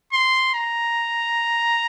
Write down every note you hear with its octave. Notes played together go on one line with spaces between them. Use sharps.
C6
A#5